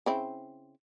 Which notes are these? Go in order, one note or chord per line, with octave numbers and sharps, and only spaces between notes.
C#3 C4 E4